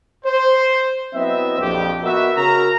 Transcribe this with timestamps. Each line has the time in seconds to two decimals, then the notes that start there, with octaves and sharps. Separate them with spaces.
0.25 C5
1.14 F#3 B3 C4 E4 D#5 E5
1.59 A#1 F2 G4
2.03 B3 F#4 A#4 D#5 E5
2.37 C#3 F#4 A#4 A#5